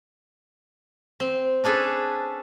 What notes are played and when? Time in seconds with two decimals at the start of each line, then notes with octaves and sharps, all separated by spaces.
1.20 C4
1.64 C#4 D4 G#4 A4 B4